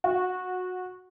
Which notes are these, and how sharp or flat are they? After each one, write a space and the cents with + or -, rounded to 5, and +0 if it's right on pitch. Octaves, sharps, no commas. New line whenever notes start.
F#4 -20